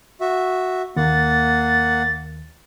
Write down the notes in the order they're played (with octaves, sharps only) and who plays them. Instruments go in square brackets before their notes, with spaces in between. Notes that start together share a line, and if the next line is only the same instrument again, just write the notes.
[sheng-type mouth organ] F#4 E5
[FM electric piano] D#2 [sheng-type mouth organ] A#3 F#5 [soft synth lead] A6